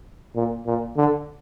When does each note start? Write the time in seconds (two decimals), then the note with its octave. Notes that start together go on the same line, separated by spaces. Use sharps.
0.36 A#2
0.66 A#2
0.97 D3